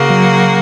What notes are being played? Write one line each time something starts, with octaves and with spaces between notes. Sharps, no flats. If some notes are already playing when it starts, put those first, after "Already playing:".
Already playing: C#3 A#3 F#4
F#3